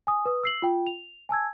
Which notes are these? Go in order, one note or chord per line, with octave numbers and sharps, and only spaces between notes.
G#5 D#6
B4 D#6
E6 C7 F#7
F4 G5
F7
G#5 A5 E6 G#6